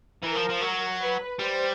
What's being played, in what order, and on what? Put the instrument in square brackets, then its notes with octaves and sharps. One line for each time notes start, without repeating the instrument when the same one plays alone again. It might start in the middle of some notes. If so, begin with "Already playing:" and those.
[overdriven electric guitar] E3 [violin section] A#4
[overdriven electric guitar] F3
F3
F#3
[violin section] B4
[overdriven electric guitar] G3 [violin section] C5